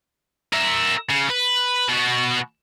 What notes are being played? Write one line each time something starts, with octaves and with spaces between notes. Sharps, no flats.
A#4 E5
C#3
B4
B2 F#4